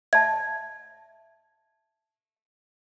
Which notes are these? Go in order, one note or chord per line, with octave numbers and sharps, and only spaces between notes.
E5 A5 G#6